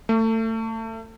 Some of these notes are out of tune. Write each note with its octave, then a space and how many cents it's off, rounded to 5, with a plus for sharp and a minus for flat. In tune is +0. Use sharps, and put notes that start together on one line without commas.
A3 +30